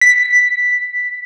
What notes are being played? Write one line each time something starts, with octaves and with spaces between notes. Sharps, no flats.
B6